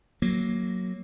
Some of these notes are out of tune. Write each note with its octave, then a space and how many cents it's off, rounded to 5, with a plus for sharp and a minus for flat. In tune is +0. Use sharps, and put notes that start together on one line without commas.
F#3 +0 A#3 +0